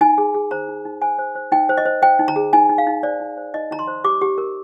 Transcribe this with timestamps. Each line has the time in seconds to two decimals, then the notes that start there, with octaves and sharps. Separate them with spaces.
0.01 D#4 G#5
0.18 G#4
0.34 G#4
0.51 C5 A#5
0.68 D#4
0.85 D#4
1.02 C5 G#5
1.19 C5
1.35 C5
1.52 D#4 G5
1.69 C5
1.77 D#5
1.85 C5
2.02 C5 G5
2.19 D#4
2.28 A#5
2.36 G#4
2.53 D#4 G#5
2.69 D#4
2.78 F5
2.87 D#4
3.03 C5 D5
3.20 D#4
3.37 C5
3.54 D#4 D#5
3.71 D#4 A#5
3.79 C6
3.87 C5
4.04 G4 D6
4.21 G4
4.38 A#4